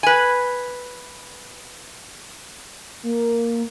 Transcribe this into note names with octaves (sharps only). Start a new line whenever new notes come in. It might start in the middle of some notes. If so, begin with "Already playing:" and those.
B4 G#5
A#3